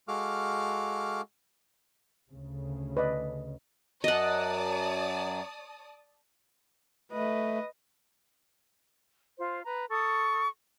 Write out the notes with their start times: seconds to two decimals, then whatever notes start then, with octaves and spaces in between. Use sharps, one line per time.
0.08 G#3 F#4 A4 F5 D6 F6
2.31 D2 C#3
2.97 B4 D5 D#5
4.04 F#2 F#3 D5 D#5 F#5 A5 D#6
7.12 A3 B4 D#5
9.38 F4 C5
9.64 B4 A#5
9.89 A4 C#6 D#6